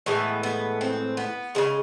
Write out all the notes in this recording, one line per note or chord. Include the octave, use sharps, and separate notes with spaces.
A2 E3 G#3 B3
B3
C4
B3
C#3 F3 G#3